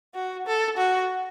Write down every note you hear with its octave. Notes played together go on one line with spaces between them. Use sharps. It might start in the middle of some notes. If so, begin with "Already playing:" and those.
F#4
A4
F#4